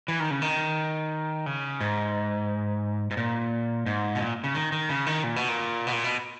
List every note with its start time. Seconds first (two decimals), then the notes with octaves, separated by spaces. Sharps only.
0.08 E3
0.20 D#3
0.31 C#3
0.42 D#3
1.46 C#3
1.81 G#2
3.11 G#2
3.17 A#2
3.86 G#2
4.15 B2
4.21 A#2
4.44 C#3
4.55 D#3
4.72 D#3
4.89 C#3
5.06 D#3
5.24 A#2
5.36 B2
5.48 A#2
5.87 B2
5.92 A#2
6.04 B2